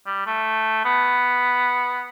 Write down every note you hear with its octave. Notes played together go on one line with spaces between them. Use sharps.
G3
A3
B3